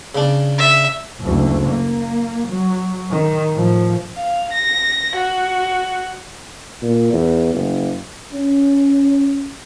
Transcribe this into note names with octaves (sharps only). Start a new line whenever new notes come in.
C#3 D4
E5
F#1 D2
A#3
F#3
D#3
A2 F3
F5
A#6
F#4
A#2
E2
F#1
C#4